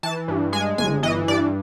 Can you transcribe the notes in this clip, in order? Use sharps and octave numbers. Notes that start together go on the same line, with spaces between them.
E3 A5
G2
G#3 G#5
G1 G#5
E3 D#5
G2 D5